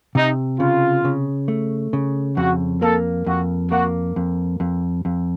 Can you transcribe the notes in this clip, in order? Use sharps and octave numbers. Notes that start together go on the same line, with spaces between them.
C3 D#4
C#3 F4
C#3
A3
C#3
F2 F#4
A#3 A4
F2 F#4
A#3 F#4
F2
F2
F2